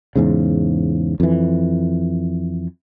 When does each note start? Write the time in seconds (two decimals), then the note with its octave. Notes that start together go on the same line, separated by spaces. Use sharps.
0.16 E2 G#2 C#3
1.20 F2 E3